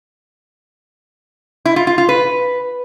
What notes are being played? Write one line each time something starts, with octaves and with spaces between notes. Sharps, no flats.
E4
F4
F4
F4
B4